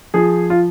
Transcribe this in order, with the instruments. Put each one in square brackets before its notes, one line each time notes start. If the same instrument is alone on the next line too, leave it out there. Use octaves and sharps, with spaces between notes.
[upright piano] F3 G#4
F4